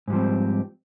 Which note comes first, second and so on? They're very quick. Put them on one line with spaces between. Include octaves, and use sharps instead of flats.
G#2 G3 F3 C4